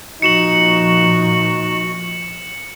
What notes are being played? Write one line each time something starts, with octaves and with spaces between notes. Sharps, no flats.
A#2 F3 D#4 F#4 C#7 E7 F#7